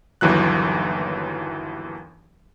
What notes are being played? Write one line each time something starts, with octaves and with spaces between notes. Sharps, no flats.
G1 D#2 E3 F#3 F#6